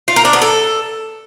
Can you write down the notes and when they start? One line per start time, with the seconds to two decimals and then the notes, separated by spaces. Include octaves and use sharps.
0.08 F4
0.16 A#4
0.25 D4
0.33 B3
0.42 A4